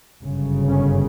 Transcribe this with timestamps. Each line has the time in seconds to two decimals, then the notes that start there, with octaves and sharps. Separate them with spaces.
0.23 G1 F#2 C#3
0.68 C#4